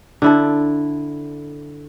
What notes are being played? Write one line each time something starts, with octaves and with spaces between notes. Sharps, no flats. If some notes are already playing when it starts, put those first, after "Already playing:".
D3 E4 A4